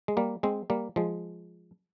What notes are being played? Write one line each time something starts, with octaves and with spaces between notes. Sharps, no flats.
G#3
G3 A#3
G#3 C4
G3 A#3
F3 G#3